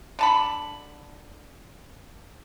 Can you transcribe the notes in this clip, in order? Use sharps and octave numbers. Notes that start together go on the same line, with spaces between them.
D3 A5 B5